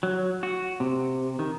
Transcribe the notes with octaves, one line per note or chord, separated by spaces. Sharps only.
F#3
F#4
C3
D#3